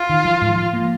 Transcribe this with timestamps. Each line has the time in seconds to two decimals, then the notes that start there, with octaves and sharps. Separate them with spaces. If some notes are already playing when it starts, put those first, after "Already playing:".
Already playing: F4
0.09 D#3
0.25 F3
0.41 G#2
0.58 F3
0.73 A#3